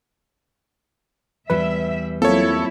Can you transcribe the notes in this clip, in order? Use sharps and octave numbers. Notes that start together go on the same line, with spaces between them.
E2 G3 B4 E5
F#3 A#3 C4 E4 F4 A4 C#5